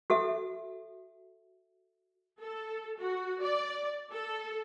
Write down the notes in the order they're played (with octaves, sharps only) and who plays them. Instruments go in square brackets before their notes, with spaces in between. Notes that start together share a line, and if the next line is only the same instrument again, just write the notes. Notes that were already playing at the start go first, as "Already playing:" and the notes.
[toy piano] F#4 A4 E5
[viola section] A4
F#4
D5
A4